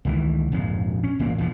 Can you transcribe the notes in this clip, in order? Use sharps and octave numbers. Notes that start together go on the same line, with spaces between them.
C#2 D#3 E3
A#1 F2 G#2 F3
C#4
G#1 A#2 E3 A#3
E2 B2 F3